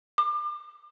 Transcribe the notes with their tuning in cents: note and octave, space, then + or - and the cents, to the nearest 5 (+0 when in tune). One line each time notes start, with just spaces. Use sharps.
D6 +35